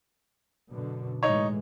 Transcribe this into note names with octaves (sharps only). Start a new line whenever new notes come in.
F#2 B2 D3
A2 E3 G#3 D#4 C#5